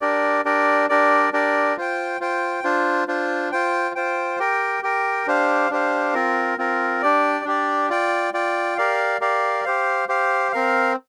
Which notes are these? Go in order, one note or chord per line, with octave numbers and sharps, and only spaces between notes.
D4 G4 A#4 D5
D4 G4 A#4 D5
D4 G4 A#4 D5
D4 G4 A#4 D5
F4 C5 G5
F4 C5 G5
D4 F4 C5
D4 F4 C5
F4 C5 G5
F4 C5 G5
G4 A#4 G5
G4 A#4 G5
D4 G4 C5 F5
D4 G4 C5 F5
C4 F4 A#4
C4 F4 A#4
D4 G4 D5
D4 G4 D5
F4 D5 G5
F4 D5 G5
G4 A#4 D5 F5
G4 A#4 D5 F5
G4 C5 F5
G4 C5 F5
C4 A#4 F5